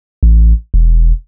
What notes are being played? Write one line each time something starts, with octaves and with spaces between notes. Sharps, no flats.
A1
E1